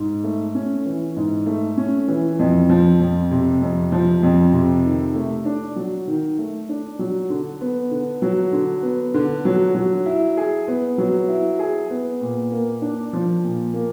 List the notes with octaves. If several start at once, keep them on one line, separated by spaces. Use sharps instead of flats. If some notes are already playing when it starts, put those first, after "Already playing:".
Already playing: G#2
A3
C#4
E3
G#2
A3
C#4
E3
F2
F3
F2
C3
F2
F3
F2
C3
D#3
A3
D4
F#3
D#3
A3
D4
F#3
D3
B3
D3
F#3
D3
B3
D3
F#3
F#3
E4
G#4
B3
F#3
E4
G#4
B3
A#2
A#3
D4
F3
A#2
A#3